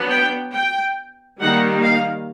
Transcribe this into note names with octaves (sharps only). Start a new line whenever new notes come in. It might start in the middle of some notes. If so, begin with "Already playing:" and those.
Already playing: F#3 B3 D4
G5
G5
D#3 G3 A#3 D#4 F#5
F5